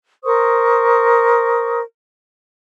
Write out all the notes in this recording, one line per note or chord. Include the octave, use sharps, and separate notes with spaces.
A#4 C5 C#6 D#6